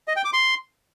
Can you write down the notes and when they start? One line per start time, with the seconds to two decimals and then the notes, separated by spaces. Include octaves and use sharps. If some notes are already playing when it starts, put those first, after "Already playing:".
0.08 D#5
0.16 G5
0.25 D6
0.33 C6